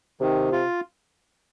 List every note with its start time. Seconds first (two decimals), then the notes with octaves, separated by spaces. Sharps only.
0.20 C3 D#3
0.52 F4